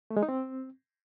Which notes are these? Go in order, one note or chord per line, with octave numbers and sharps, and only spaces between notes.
A3
G#3
D#4
C4